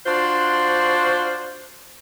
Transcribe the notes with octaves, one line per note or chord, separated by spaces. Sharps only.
D4 F4 F#4 C5